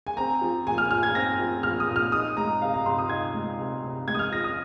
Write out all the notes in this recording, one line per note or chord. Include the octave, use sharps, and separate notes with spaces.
G#5
C4 A#5
F3
A#2 G#5
F6
A#2 F6
G#6
C4 A#6
F3
A#2 F6
D#6
A#2
F6
D#4 D#6
G#3 A#5
C3 F5
A#5
C3 C6
D#6
D#4 G#6
G#3
C3
C3
G#3 G#6
D#6
F6
F3 A#6
D#6